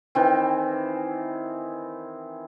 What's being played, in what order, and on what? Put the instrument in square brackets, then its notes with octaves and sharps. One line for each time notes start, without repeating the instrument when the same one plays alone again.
[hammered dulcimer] D#3 E3 C4